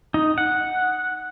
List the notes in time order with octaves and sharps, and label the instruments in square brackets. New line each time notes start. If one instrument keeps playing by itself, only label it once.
[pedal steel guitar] D#4
F#5